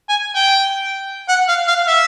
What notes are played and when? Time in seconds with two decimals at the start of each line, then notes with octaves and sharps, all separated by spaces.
0.09 G#5
0.36 G5
1.29 F#5
1.49 F5
1.68 F5
1.88 E5